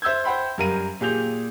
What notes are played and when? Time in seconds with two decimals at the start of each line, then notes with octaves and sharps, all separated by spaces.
0.02 C5 E5 E6 G6 G#6
0.24 C5 F#5 G5 B5 C6
0.58 F#2 G3 A#4 F5 D#7
1.01 A#2 G4 G#4 G6 F7